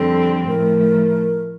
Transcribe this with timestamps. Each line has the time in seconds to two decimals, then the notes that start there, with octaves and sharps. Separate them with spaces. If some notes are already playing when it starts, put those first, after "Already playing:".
Already playing: F2 D3 G3 C4 A4
0.48 A2 F3 A3 A#4